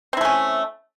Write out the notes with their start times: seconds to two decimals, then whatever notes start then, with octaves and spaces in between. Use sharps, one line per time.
0.13 C4
0.17 E4
0.21 A3
0.25 C#4